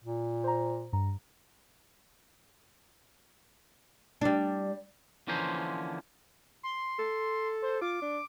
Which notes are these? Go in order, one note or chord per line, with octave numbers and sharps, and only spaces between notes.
A#2
C5 A#5
G2 A#5
G3 D4
D3 E3 F3 A#3 C#4 C5
C6
A4
C5
F4 D6
D4